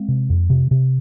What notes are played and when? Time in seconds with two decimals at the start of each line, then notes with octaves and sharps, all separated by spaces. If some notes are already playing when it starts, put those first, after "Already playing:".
Already playing: G#3 C4
0.08 C3
0.29 F2
0.50 C3
0.71 C3